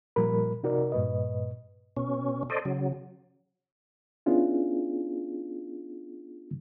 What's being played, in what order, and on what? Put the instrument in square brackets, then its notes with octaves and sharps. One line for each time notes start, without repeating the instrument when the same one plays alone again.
[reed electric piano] A#2 F3 G3 A#4 B5
C3 D#4 F#4 A#4 D5
G2 A#2 B4 D#5
[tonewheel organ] B2 C#4
A4 C5 D5 D#5
C#3 F#3
[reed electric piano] B3 C#4 D4 E4 F4 G#4